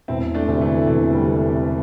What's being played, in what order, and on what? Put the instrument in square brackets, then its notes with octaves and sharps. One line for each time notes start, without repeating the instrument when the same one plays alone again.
[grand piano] E1 [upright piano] C4 E4
[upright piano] A3 D4
[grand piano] D2 C3
[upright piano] E3 A3
[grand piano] E1 [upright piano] E3 A3
[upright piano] D3 G3
[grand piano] C3